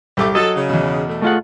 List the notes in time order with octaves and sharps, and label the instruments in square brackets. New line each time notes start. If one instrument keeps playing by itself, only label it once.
[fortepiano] C2 G4 D6 [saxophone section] A3
[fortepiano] F#3 [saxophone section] A4 [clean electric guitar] D#5
[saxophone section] C#3
[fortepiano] E2 B2
[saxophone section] A3
[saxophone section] A2 C3 G#3 [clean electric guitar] A3 F4 F#5